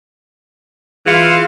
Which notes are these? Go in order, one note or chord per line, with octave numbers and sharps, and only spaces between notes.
E3 F4 G#4 F5 C#7